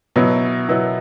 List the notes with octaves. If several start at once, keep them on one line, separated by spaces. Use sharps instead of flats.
B2 F#3 B3 E4
B2 F#3 B3 E4